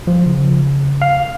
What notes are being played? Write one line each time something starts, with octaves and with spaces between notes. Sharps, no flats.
F3
C#3
F5